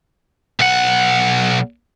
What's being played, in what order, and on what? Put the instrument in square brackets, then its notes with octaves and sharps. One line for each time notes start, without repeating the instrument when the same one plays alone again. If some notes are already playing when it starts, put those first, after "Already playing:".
[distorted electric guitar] B1 F#5